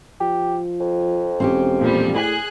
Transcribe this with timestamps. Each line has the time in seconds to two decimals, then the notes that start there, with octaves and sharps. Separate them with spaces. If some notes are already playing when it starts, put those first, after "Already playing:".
0.20 F3 G4
0.80 F2
1.40 E1 C4 C#4 G4
1.79 A#2 F3 G3
2.15 A2 G#4 G#5 F#6